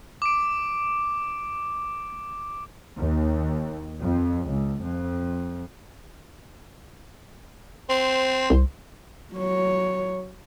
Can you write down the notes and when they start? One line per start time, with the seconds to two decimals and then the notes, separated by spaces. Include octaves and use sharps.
0.22 D6 D7
2.97 D#2
4.02 F2
4.50 C#2
4.82 F2
7.90 C4 C5
8.50 C2
9.34 F#3 C#5